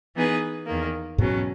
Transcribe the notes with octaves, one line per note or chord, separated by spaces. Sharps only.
E3 B3 D#4 G#4 B4
E2 D#3 A#3
E2 G#2 B2 F#3 C#4